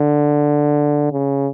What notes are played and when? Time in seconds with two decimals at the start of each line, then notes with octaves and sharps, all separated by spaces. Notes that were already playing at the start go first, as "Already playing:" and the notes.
Already playing: D3
1.12 C#3